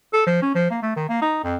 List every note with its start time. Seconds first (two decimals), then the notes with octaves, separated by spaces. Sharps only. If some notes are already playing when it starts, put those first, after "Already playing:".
0.13 A4
0.26 F3
0.42 C#4
0.55 F3
0.70 A#3
0.82 A3
0.96 D#3
1.09 A#3
1.22 D#4
1.43 F2